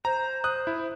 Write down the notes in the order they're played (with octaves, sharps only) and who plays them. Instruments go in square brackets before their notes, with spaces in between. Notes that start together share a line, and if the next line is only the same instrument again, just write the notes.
[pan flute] C5 [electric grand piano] A#5
[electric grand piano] D#6 F#6
E4